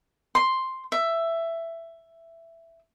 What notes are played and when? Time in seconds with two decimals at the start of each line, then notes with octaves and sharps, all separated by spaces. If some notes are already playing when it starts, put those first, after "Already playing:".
0.35 C6
0.92 E5